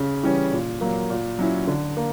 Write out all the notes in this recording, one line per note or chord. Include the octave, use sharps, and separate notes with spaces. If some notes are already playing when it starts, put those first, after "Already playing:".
Already playing: C#3
E3 G3 C#4
A#2
F#3 A#3
A#2
F#3 C#4 E4
D3
A#3